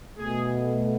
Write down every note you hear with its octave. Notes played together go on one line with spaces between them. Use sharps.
B2 A3 G#4